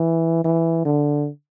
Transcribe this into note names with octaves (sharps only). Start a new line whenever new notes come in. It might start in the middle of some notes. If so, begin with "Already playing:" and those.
Already playing: E3
E3
D3